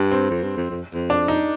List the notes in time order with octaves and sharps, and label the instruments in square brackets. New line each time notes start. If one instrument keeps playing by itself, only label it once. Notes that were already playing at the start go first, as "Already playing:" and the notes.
Already playing: [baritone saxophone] G2
[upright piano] C4
[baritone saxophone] F2
G2
F2
F2
F2
[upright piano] D4
D#4